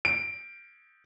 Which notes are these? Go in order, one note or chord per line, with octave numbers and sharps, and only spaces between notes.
D7